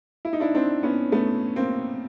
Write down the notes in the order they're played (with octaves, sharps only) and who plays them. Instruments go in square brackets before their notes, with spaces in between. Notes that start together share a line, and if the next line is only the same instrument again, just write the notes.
[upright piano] E4
D#4
D4 E4
C4 D4
B3 C#4
A3 B3
A#3 C4